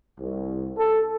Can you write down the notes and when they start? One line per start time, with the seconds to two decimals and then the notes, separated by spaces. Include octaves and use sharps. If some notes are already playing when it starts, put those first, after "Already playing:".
0.20 C2
0.77 A4